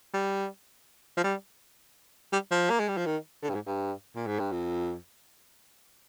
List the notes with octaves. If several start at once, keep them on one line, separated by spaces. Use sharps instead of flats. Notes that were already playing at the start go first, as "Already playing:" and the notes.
G3
F3
G3
G3
F3
A#3
G#3
G3
F3
D#3
D3
G2
G#2
G2
A#2
G#2
G2
F2